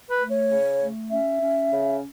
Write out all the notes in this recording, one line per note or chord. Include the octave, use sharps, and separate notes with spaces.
B4
A3
C#5
C#3
A3
C#4 E5
C#4
C#3